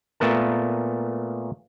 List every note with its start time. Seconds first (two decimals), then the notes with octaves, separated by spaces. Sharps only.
0.20 A#2 A3 B3 A#4 A5